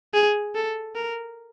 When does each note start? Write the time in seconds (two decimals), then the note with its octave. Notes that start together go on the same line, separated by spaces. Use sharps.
0.14 G#4
0.55 A4
0.96 A#4